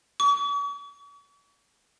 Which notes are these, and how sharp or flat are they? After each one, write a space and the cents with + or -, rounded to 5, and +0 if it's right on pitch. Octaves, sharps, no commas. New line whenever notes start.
C#6 +45